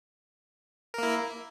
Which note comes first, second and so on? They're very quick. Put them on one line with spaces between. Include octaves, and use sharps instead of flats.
A#4 A#3 E4